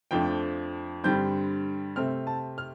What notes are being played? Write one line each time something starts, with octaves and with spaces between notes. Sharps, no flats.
F2 F3 A3 D4 G5
G2 D3 G3 C4 G6
C3 A3 C4 F6
A5
F6